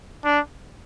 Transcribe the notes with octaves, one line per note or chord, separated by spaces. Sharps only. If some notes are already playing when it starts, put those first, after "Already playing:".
D4